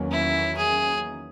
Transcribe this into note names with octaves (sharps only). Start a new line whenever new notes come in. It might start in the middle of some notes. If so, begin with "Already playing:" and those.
Already playing: E2 D#3 F#3 A#3 C#4
E4
G#4